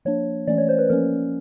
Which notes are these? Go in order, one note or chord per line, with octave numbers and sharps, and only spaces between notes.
F3 A#3 D4 C#5
E3 A3 C#4 D5
C#5
C5
B4
F3 A#3 C#4 A#4